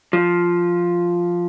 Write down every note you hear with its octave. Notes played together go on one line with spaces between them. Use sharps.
F3